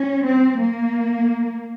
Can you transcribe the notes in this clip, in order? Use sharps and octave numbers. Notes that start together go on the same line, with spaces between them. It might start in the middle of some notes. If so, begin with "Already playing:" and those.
Already playing: C#4
C4
A#3